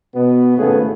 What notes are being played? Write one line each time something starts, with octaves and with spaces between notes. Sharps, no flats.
B2 B3
G#1 A2 C#3 A3 B3 G#4